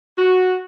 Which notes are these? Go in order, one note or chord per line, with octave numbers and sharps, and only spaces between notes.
F#4